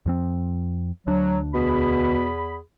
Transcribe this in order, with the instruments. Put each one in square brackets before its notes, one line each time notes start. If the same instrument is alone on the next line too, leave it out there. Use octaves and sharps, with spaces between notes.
[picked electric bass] F2 F3 C4
[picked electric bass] D2 D4 [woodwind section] F#3
[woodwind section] E2 G#4 B5 [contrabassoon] B2